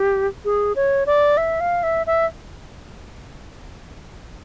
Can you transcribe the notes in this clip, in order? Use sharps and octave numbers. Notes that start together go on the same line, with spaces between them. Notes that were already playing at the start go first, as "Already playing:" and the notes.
Already playing: G4
G#4
C#5
D5
E5
F5
E5
E5